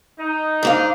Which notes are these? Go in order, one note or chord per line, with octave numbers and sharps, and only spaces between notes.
D#4
G#2 D4 F5